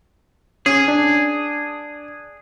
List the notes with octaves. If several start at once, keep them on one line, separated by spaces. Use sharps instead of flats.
C#4 G#4
D4